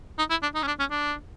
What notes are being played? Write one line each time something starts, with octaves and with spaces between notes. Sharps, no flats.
D#4
E4
D4
D#4
C#4
D4
C#4
D4